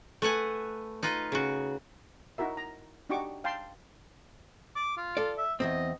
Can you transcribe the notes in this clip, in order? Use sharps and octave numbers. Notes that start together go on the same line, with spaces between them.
A3 B4 F#5 G#5
D#4 F4 B4 D#5
C#3 F#4
D#4 E4 F#4 A#4 E5
A#5
D4 D#4 F#4 G4 C#6 D6
F5 G5 A5 C6
D6
F4
A4 D5
E5
E2 G2 C4 D#5